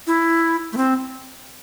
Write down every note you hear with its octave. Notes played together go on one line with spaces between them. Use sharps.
E4
A3
C4